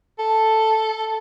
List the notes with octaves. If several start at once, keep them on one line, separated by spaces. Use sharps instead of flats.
A4